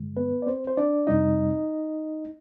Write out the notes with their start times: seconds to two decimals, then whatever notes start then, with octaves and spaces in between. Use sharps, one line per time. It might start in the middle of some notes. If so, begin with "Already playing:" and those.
Already playing: G2 D3 G#3
0.17 B3 B4
0.42 D5
0.47 C4 C5
0.67 C5
0.77 D4 D5
1.07 F2 C3 G3 C4 D#4 D#5